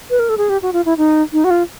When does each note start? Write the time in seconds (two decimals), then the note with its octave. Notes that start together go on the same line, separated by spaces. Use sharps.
0.10 B4
0.19 A#4
0.29 A4
0.38 G#4
0.49 G4
0.62 F#4
0.73 F4
0.85 E4
0.97 D#4
1.33 D#4
1.44 F#4
1.50 F4